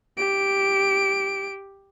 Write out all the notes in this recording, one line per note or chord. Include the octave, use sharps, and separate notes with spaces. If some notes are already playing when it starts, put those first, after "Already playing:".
G4 D7